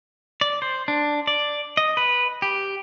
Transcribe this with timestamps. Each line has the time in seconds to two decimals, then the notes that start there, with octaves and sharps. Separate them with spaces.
0.41 D5
0.62 C5
0.88 D4
1.27 D5
1.77 D#5
1.97 B4
2.42 G4